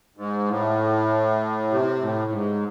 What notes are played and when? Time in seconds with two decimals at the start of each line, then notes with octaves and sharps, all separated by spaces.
0.17 G#2
0.48 A2
1.71 C3
2.01 A2
2.32 G#2